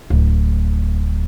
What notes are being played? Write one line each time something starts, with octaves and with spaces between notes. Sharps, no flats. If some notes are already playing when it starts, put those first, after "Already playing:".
D1